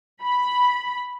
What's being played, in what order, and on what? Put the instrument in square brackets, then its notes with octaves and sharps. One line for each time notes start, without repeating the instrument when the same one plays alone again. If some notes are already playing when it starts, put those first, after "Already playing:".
[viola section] B5